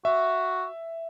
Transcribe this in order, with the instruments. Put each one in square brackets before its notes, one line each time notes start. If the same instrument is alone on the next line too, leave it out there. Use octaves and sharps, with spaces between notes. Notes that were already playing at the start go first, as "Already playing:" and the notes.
[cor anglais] F#4 [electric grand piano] E5